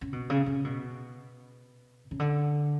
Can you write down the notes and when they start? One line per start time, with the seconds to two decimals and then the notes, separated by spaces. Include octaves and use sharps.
0.01 C#3
0.13 B2
0.30 C#3
0.46 C#3
0.64 B2
2.11 C#3
2.19 D3